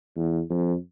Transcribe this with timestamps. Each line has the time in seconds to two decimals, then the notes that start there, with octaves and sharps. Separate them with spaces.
0.16 E2
0.50 F2